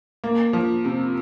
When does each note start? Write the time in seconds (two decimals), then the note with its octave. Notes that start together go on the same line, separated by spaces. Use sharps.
0.24 A#3
0.53 F3
0.85 C3